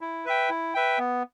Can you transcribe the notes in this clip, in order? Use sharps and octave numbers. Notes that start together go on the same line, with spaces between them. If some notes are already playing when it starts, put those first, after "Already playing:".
E4
B4 E5 G5
E4
B4 E5 G5
B3